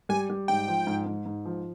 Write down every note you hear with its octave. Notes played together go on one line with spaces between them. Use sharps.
G3 G#5
G3
G#2 G5
F3
G#2
G#2
G#2
F3